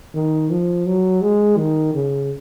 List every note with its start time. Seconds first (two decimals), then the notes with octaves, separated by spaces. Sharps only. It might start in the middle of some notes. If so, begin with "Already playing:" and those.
0.14 D#3
0.50 F3
0.86 F#3
1.21 G#3
1.57 D#3
1.94 C#3